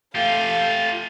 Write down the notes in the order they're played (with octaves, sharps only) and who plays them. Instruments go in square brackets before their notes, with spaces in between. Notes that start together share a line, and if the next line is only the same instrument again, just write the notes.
[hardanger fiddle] A3 F5 [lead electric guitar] F4 G4